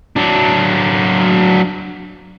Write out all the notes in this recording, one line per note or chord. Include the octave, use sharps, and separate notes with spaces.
F#3 D4